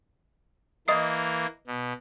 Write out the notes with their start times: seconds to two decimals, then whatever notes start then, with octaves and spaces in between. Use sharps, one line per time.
0.88 E3 A#3 D#5 D#6 C7
1.67 B2